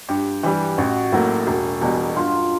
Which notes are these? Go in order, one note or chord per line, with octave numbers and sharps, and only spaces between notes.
G2 G4
E3 G3 G4
A1 F#4
A2 F#3 A#3
E1
E2 B2 G3
G2 F4